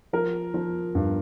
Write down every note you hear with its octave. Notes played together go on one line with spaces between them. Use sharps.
F3 A#4
F3
G2